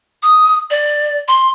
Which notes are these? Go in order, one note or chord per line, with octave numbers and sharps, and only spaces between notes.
D#6
D5
C6